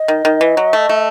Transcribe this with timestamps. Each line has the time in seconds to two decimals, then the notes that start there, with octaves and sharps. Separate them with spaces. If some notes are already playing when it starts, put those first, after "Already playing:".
Already playing: D#5
0.08 D#3
0.25 D#3
0.41 E3
0.57 F#3
0.73 A3
0.89 A3